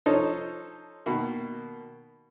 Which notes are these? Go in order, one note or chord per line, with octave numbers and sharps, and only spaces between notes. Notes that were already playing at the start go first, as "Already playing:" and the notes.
F3 D#4 A4 C5 C#5
B2 D#3 A#3